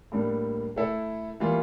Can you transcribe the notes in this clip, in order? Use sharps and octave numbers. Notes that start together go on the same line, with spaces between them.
A2 G3 A#3 D4
A3 E4 A4
E3 G3 A#3 F4